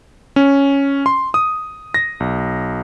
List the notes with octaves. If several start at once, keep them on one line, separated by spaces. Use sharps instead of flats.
C#4
C6
D#6
A#6
B1